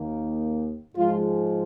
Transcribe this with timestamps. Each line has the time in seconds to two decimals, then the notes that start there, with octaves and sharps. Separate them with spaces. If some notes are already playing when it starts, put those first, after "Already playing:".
Already playing: D#2 D#3 A#3
0.96 G#2 F3 G#3 F4